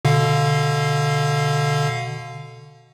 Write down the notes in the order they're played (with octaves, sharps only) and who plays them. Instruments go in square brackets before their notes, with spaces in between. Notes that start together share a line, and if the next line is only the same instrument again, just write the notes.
[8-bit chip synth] B2 D3 F5